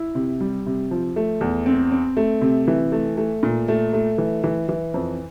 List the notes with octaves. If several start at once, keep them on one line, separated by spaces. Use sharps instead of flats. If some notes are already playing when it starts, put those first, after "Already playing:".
Already playing: E4
C3
G3
C3
F3
A3
E2
C4
C4
A3
C3
E3
A3
A3
A#2
A3
A3
E3
E3
E3
F2